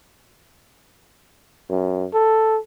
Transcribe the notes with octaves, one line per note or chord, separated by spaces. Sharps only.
F#2
A4